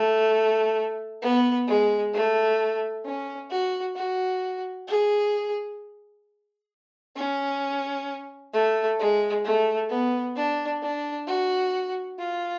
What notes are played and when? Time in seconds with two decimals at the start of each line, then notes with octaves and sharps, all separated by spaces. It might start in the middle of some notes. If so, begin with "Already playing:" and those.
Already playing: A3
1.22 B3
1.68 G#3
2.14 A3
3.05 C#4
3.51 F#4
3.96 F#4
4.88 G#4
7.16 C#4
8.53 A3
9.00 G#3
9.45 A3
9.90 B3
10.36 D4
10.82 D4
11.27 F#4
12.19 F4